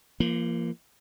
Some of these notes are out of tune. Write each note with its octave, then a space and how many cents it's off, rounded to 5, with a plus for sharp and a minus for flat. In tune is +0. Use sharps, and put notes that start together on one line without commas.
F3 -35 A#3 +0